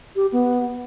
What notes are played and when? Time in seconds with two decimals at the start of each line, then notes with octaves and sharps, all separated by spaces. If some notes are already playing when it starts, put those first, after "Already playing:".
0.16 G4
0.32 B3